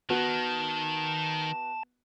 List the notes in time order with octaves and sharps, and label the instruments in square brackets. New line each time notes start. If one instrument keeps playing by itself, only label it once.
[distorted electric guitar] D#3 [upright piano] B3 F#4 [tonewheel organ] A5